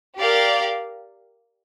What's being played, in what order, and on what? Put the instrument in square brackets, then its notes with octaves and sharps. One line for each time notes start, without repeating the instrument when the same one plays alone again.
[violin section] G4 A#4 D5 F5